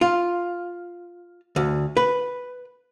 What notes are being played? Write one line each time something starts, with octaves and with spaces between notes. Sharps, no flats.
F4
D2
B4